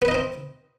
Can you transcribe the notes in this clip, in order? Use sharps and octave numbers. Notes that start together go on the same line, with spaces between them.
B3 C4 D#4 B4 D#5